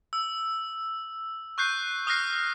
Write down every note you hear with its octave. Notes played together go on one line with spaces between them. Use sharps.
E6
C#6 F#6 G6 C7
D#6 F6 F#6 A#6 C7